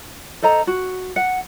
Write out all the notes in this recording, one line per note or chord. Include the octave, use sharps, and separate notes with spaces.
A4 C5 D#5 A#5
F#4
F#5